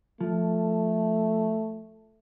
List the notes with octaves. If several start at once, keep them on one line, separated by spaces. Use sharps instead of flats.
F3 A3